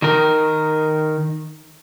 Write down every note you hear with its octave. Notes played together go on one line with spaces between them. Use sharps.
D#3 A#4